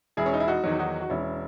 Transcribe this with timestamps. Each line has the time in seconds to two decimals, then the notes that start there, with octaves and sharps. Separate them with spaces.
0.17 E1 E4 G#4
0.26 C#4
0.34 D#4
0.40 E4
0.48 D#4 F#4
0.64 E2 D#3 F#3
0.79 D#4 F#4
1.01 F#4
1.10 E1 C#4 E4